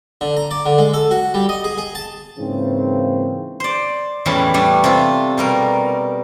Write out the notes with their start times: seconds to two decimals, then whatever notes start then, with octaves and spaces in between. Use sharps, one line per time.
0.21 D3
0.37 A#5
0.51 D5
0.66 D3
0.78 G#3
0.94 A4
1.11 F#4
1.34 G3
1.49 D#5
1.64 G#4
1.78 G#4
1.95 A5
2.39 G#2 C#3 E3 A#3 C4
3.60 C5 D5
4.26 E2 A2 E3 G3 C#4 A5
4.54 G3 A3 D4
4.84 C3 F4
5.38 B2 G3 A#4